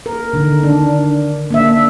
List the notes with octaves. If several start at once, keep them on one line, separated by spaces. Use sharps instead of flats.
A#4
D3 D#3
D4
A#3 D4 E5